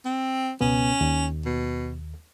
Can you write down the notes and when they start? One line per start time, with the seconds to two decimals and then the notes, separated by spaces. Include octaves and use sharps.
0.05 C4
0.61 C#2 B2 B3 C#4
1.01 D#2
1.46 B2